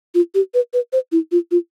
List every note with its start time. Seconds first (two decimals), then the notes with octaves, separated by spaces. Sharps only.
0.14 F4
0.34 G4
0.54 B4
0.73 B4
0.93 C5
1.12 E4
1.32 F4
1.51 F4